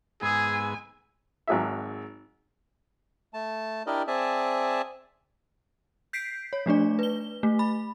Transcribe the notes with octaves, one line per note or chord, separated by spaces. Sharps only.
G#2 B3 G#4 G#5 E6
G#1 F#3 G#4 E5
A3 A5
D4 E4 G4 A#4 D5 D#5
C4 G#4 D5 E5 G#5 A5
G6 B6 C7 D7
C#5
F3 A3 D4 D5
B4 G7
A3
B5